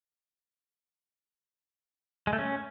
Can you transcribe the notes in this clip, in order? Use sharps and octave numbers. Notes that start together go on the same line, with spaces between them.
G#3
A3
C#4